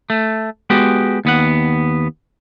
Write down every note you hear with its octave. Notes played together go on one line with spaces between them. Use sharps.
A3
G#3 B3 F#4 G4
D#2 B3 F#5